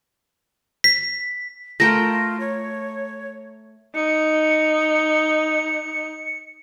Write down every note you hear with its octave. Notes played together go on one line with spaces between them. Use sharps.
B6
A3 F4 A#4 G5 A#6
C#5
D#4 C#7